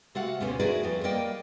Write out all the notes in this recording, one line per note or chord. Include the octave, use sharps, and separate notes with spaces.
C3 A3 F#4 F5 F#5
D2 B2 B3 C#4 C5 G#5
E4 F#4 G#4 A#4 B4 D5
F2
G3 A#3 A#4 D5 D#5 G5